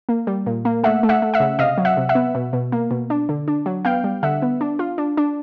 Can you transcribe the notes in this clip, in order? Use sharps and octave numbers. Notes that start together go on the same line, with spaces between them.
A#3
G3
A#2
A#3
A3 E5 F#5
A3
E5 F#5
A3
E5 F#5
C#3
C3 D#5 F5
F#3
E5 F#5
C3
E5 F#5
B3
B2
B2
A#3
B2
D4
D3
D4
F#3
B3 F5 G5
G3
D3 E5 F#5
B3
D4
F4
D4
D4